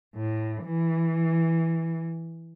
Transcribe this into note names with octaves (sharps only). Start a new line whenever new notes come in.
A2
E3